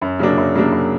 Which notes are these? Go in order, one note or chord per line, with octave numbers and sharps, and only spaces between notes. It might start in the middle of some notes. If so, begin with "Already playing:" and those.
F#2
C#3 F#3 A#3 D4
F#2
C#3 F#3 A#3 D4
F#2